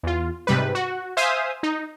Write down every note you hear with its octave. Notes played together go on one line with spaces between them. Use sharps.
E2 F4
G#2 C3 G3 B4
F#4
C5 E5 F5 G#5 D#6
D#4